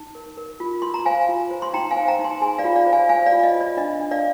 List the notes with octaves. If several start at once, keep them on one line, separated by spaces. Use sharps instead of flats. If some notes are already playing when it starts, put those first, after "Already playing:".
Already playing: D#4
A#4
A#4
F4
F4 C6
A#5
C5 F5 G#5
F4
C5
C6
D#4 G5 A#5
F5 G#5
C5
G5 A#5
D#4
G#5 C6
G#4 G#5 C6
D5 F5
F4
D5 F5
C5
F5 G#5
C5 F5 G#5
D5 F5
F4
D#5
F4
D5
D4 D#5
D4
D5 F5